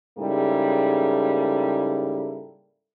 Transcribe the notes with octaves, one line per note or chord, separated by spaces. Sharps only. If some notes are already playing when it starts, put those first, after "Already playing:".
G#2 C#3 G3 A#3 E4 A4